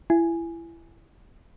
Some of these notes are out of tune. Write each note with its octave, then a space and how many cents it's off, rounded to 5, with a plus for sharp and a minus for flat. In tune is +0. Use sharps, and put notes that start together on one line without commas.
E4 +25 G#5 +0